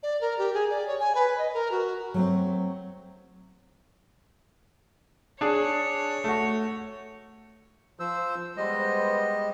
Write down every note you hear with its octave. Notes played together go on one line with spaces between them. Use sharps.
D5
A#4
G4
G#4
D5
C#5
G#5
B4
D#5
A#4
F#4
F#3 A3 C4
D4 G#4 C#5
A3 F#4
F3 C5 E6
G3 G#3 B3 C5 D#5